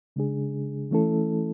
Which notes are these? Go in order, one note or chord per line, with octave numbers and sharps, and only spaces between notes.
C#3 G#3 D4 G#4
E3 A3 C#4 E4 A4